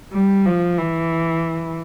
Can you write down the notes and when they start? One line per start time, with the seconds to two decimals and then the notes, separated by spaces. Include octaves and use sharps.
0.13 G3
0.46 F3
0.78 E3